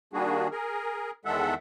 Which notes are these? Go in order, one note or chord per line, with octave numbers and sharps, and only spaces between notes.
D#3 G3 A#3 D4 F#4 G#4
G#4 A#4
E2 D#3 G#3 A4 E5 F#5